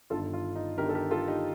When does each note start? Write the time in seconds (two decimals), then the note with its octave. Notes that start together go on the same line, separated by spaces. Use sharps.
0.10 G1 G2 D#3 F4 A4
0.33 F4
0.56 D#4
0.78 G1 G2 D#3 G4 A#4
0.89 A4
0.95 G4 A#4
1.11 F4 A4
1.28 D#4 G4